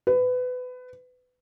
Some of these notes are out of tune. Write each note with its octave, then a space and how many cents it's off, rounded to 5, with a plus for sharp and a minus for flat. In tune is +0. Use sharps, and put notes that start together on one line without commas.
B4 +25